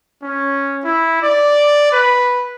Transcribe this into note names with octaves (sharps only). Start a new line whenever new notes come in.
C#4
E4
D5
B4